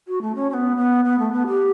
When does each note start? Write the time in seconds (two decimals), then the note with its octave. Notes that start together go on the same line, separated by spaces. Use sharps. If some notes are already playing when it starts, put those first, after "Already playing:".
0.08 F#4
0.22 A3
0.35 C#4
0.50 C#4
0.54 B3
0.77 B3
1.05 B3
1.19 A3
1.32 B3
1.47 G4